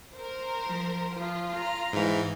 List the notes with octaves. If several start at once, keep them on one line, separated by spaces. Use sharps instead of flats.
A#4 C5
F3
F3 F4
A#5 F6
G#2 E3